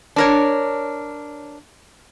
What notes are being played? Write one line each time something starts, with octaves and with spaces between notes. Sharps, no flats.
D4 A#4 C#5